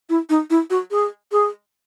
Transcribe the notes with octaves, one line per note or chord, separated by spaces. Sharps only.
E4
D#4
E4
F#4
G#4
G#4